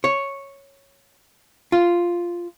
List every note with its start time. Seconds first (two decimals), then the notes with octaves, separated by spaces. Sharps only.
0.04 C#5
1.72 F4